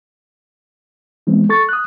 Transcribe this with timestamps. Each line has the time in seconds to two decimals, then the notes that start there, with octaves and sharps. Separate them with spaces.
1.27 E3 G#3 B3 C4
1.49 A4 C#6 A6
1.69 D#6 F#6